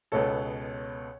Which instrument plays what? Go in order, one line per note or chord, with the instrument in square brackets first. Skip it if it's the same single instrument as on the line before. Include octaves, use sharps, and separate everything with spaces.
[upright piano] C#2 B2 B3 A4 [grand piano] C#5